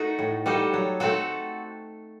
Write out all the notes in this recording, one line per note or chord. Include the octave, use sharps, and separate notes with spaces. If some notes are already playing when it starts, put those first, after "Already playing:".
Already playing: A3 D#4 F#4
A2
G3 D#4 F#4 A4
F#3
A3 C4 F#4 A4